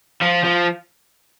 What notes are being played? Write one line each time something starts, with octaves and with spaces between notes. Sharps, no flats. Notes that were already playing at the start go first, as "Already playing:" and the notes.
F3
F3